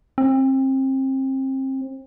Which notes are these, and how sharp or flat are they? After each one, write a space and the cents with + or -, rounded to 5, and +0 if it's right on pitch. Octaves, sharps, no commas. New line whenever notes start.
C4 +30